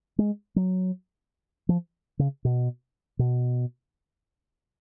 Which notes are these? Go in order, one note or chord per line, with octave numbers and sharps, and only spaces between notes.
G#3
F#3
F3
C#3
B2
B2